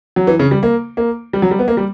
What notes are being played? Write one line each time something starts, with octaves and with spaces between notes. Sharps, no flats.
F#3
E3
C#3
G3
A#3
A#3
G3
F#3
G3
B3
A#3
G3